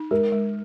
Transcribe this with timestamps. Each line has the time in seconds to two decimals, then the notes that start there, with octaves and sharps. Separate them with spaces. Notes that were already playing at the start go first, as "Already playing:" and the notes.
Already playing: D#4
0.11 G#3 A#4
0.32 G#3